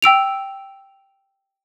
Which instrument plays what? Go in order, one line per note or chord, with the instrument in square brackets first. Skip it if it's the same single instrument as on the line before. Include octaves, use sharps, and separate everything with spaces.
[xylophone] G5 E6 D7 F7